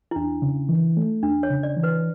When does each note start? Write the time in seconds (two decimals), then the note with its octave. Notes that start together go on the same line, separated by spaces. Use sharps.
0.11 E4
0.16 E2 D4
0.42 C#3
0.69 E3
0.97 A3
1.23 E2 D4
1.43 C#5
1.50 C#3
1.63 D5
1.77 E3
1.83 B4